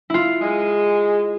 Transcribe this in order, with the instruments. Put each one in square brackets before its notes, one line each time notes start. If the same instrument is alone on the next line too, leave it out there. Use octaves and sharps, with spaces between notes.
[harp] E4 F4
[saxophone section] G#3